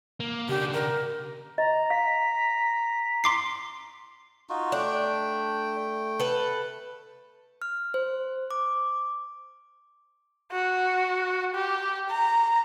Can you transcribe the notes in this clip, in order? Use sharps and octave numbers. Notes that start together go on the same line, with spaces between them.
A#3
C#3 D4 G4
A#4
D#5 A#5
F5 B6
C6 D6 C7
D#4 F4 F#4
A3 D4 G5
A4 B4
F6
C5
D6
F#4
G4
A#5